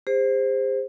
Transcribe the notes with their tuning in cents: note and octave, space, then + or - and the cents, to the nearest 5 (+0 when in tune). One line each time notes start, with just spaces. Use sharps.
G#4 -45 C5 +0